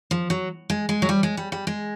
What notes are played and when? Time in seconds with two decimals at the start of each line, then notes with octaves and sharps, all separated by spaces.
0.11 F3
0.30 F#3
0.70 G#3
0.89 G#3
1.02 F#3
1.09 G3
1.23 G#3
1.37 G3
1.52 G3
1.67 G#3